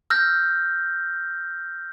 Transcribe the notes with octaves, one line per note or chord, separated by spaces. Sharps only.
E6 F6 G6 A#6